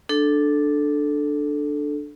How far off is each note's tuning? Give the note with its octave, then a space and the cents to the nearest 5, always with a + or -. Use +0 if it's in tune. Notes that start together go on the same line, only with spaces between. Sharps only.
D4 +10 A4 -10